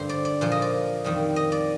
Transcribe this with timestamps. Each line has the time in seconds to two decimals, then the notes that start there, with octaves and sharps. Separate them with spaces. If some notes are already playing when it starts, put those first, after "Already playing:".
Already playing: G2 D3 G3 C5
0.09 D5
0.25 D5
0.41 A#2 F3 C5
0.52 D#5
0.62 D5
1.04 F2 D#3 G3
1.36 D#5
1.52 D5